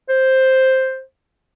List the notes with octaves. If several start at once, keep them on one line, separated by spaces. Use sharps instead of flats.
C5